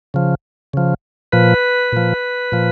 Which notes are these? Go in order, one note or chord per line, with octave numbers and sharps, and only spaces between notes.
C#3 F3
C#3 F3
A#2 F3 B4
A#2 F3
A#2 F3